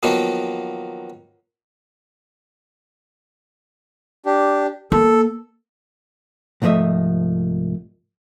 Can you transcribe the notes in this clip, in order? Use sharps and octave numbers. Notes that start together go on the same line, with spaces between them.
D#3 F3 F#3 A#3 B3
D4 G4
A#3 A4
C2 G#2 F3 A3 D#5 E5